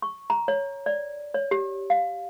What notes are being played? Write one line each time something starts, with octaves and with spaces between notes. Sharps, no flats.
C#6
A#5
C#5
D5
C#5
G4
F5